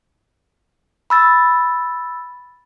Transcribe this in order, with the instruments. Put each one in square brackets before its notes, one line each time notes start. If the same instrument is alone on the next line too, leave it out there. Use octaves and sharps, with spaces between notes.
[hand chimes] B5 E6 A6